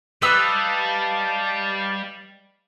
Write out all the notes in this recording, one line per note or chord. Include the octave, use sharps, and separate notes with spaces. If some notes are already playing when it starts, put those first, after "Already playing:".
G3 G4 B4 D#5 F5 A5 E6